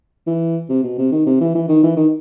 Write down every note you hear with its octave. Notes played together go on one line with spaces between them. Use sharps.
E3
C3
B2
C3
D#3
C3
E3
E3
D#3
E3
D#3